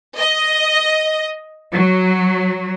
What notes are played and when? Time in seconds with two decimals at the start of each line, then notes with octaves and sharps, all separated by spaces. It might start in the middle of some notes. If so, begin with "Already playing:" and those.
0.19 D#5
1.73 F#3